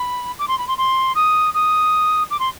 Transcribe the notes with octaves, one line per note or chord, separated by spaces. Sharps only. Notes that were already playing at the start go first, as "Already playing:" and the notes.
Already playing: B5
D6
C6
B5
C6
C6
D#6
D#6
D6
C6